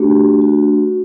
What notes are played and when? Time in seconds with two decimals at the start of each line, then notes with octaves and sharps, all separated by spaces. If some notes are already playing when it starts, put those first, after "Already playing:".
Already playing: A3 D4 F#4 G4
0.42 F#4